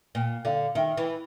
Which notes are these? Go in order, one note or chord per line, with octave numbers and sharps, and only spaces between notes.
A#2
D3 F5
D#3 E5
E3